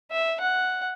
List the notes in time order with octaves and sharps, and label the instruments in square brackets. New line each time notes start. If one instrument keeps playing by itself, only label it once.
[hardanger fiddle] E5
F#5